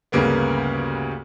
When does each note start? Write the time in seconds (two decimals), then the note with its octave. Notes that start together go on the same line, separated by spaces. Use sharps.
0.12 D2 G2 C#3 A#3 B3